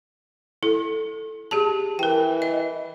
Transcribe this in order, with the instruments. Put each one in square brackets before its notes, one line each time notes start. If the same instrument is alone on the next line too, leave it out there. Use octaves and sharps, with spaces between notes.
[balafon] E4 A4
G4 G#4 A5
[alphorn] E3 [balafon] A#4 G5
[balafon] D#5